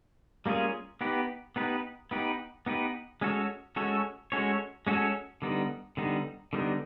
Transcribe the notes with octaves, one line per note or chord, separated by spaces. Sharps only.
G3 A#3 C#4 F4 G#4
B3 D#4 G4 B4
B3 D#4 G4 B4
B3 D#4 G4 B4
B3 D#4 G4 B4
G#3 C#4 F#4 A4 C#5
G#3 C#4 F#4 A4 C#5
G#3 C#4 F#4 A4 C#5
G#3 C#4 F#4 A4 C#5
D3 G3 B3 D#4
D3 G3 B3 D#4
D3 G3 B3 D#4